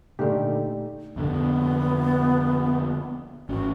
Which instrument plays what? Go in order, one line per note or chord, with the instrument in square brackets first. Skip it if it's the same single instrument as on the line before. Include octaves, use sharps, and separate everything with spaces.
[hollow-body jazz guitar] A#2 D3 [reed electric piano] A3 D#4 G4
[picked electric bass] F2 B2 D3 [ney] B3
[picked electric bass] G#1 C#4 [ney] F#4